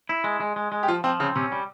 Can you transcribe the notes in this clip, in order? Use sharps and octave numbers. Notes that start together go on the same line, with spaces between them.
E4
G#3
G#3
G#3
G#3
G4
F3 F4
F3 C4
C#3 C4
C3 C#4
G3